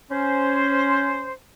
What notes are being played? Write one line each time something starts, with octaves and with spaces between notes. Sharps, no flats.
C#4 C5